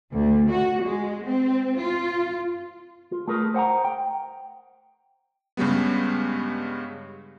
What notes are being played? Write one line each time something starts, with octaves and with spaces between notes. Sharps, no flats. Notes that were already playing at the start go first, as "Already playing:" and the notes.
D2
F#4
G#3
C4
F4
F4
A3 G#4 A#4 B4
C5 F#5 G5 A#5
G5
G2 C#3 G3 G#3 B3